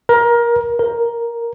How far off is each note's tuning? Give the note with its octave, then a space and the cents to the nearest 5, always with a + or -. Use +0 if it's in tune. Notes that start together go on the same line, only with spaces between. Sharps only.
A#4 +20
A#4 +5